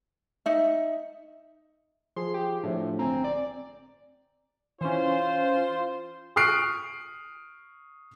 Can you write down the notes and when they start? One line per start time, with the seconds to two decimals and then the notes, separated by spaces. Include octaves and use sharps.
0.46 D#4 E5
2.16 F3 G#4 C6
2.34 G4
2.64 A2 F3 A3 D4
2.99 G1 C4 G#5 A#5
3.24 D5
4.81 E3 C#4 F4 C5
6.36 C#6 D#6 F6 F#6 C7 D7